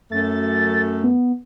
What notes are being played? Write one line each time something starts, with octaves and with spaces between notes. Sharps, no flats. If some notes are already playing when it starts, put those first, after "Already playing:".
F#2 A3 A6
B3